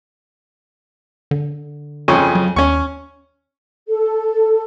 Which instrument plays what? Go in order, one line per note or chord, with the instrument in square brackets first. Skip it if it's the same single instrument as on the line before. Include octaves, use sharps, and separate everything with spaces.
[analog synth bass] D3
[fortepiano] F2 C#3 C#4
[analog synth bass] F#3
[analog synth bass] D#2 [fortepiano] C#4 C#6
[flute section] A4